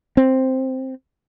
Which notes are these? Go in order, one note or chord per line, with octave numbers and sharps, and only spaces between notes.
C4